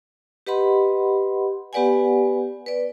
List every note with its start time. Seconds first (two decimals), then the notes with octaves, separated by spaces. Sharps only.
0.47 G4 B4 D#5 F#5 B5 C6
1.73 B3 G4 B4 D5 F#5 G#5
2.66 B4 D5